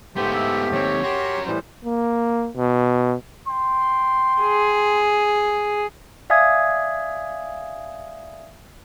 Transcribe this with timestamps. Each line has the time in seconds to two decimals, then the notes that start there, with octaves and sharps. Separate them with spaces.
0.16 G#2 A3 B3 F4 G4 C5
0.33 E4
0.73 D#2 C4 C#5
1.03 F#4 G4 A#4 C6
1.46 A2 E3 G3 C5
1.85 A#3
2.57 B2
3.48 G5 C6
4.42 G#4
6.30 D5 E5 F5 G#5 D#6 G#6